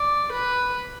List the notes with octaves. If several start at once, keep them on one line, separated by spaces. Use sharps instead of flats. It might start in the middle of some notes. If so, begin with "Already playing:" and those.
Already playing: D5
B4